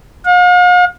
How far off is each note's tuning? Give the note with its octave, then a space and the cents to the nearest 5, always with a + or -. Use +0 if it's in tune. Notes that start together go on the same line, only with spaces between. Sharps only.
F5 +45